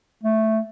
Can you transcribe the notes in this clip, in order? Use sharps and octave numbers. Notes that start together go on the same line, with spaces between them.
A3